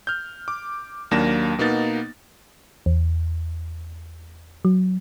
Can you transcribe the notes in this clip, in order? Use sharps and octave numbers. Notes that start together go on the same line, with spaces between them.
F6 G6
D6
D#2 F#3 A#3 D4 A#6 E7
B2 A#3 B3 D#4 A6
E2
F#3